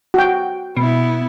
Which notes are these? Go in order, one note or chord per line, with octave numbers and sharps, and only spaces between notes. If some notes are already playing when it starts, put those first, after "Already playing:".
F#4 G5
B2 B3 E4